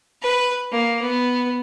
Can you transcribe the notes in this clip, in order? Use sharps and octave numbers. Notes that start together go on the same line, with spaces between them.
B4
A#3
B3